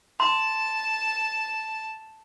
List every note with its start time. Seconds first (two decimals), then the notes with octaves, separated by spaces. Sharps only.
0.20 A5 C6